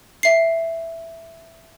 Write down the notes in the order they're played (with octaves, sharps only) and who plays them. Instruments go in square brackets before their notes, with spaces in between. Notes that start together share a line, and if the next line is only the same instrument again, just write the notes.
[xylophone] E5 C7